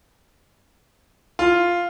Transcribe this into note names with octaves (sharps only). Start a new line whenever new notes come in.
F4